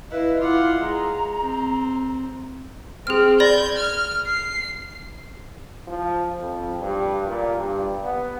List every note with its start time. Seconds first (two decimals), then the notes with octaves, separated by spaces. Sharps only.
0.10 E4 B4 D#5 F5
0.39 E4 F4 F5 F#5 D6
0.80 G#3 A#5
1.42 C4
3.07 C4 G#4 F6
3.40 D5 B5 G6 G#6 A#6
3.77 F6
4.27 C7
5.87 F3
6.40 F2
6.80 G2
7.26 A#2
7.56 G2
8.04 B3